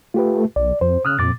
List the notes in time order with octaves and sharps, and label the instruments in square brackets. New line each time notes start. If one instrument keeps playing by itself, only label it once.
[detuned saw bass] A3 [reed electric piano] F4 G4 B4
[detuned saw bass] B1 [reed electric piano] D5
[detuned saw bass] F2 [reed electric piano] C5
[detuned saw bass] C#3 [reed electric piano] D#6 F6 F#6
[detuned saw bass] F2 [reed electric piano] A#2 D6 A6